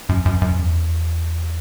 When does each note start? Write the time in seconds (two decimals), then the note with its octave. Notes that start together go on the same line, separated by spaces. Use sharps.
0.09 F#2
0.26 F#2
0.42 F#2
0.58 E2